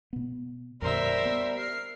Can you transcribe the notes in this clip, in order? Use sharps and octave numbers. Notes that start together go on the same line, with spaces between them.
B2 B3
F2 A#2 D3 G3 A#4 C5 E5
B3
F6 C7